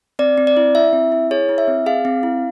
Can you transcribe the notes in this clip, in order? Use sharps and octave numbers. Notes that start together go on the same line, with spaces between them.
C4 D5
C4
D5
E4
E4 E5
C4
E4
G#4 C#5
E4
E5
C4
G#4 F5
C4
E4